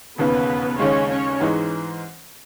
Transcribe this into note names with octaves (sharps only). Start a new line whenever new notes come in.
E1 D#2 C#3 B3 B4
D#2 C#3 G#3 C#4 C#5
C#4 C#5
G#2 E3 G#3 D#4